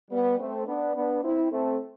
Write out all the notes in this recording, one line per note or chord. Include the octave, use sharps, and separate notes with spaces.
G3 B3
A3 C4
B3 D4
B3 D4
C4 E4
A3 C4